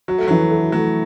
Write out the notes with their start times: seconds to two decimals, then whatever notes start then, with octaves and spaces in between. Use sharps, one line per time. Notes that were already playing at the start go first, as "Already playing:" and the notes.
0.08 F#3 F#4
0.18 A3
0.28 E3 F#3
0.51 A4
0.72 F#3 A3